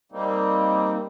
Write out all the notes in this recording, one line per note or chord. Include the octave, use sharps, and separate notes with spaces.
G3 A#3 C4 D#4